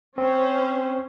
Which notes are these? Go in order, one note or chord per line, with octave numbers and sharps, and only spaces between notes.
C4 C#4 C5